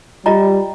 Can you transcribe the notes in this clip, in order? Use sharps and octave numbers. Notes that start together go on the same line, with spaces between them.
G3 F4 D#5 A#5